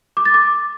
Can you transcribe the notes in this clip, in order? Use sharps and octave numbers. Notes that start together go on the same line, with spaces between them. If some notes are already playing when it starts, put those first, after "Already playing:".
D6
A6
D6